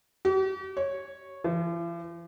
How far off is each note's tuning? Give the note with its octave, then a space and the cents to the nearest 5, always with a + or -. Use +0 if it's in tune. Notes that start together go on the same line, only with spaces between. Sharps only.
G4 -45
C#5 -10
E3 +45